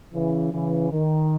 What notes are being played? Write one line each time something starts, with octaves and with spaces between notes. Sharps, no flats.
C#3 E3
C#3 E3
D#3